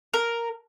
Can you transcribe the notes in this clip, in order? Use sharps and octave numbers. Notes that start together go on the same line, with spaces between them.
A#4